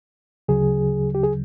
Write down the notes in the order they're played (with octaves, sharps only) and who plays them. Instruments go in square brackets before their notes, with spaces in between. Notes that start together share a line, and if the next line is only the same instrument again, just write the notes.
[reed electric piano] D2 C#3 F#3 G#4
G4
G#4